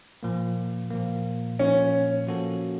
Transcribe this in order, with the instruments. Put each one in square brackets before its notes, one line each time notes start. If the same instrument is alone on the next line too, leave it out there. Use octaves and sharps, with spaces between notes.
[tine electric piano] A#2 F3 A#3
A#2 F3 A#3
[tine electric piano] A#2 F3 A#3 [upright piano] C#4
[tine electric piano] F3 A#3 C#4 F#4 A4